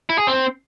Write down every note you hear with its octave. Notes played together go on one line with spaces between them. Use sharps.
E4
G#4
C4